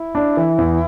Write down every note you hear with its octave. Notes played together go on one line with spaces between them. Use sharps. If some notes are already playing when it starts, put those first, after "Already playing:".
Already playing: E4
D4
E3
E2